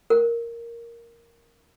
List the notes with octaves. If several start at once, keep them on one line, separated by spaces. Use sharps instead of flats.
A#4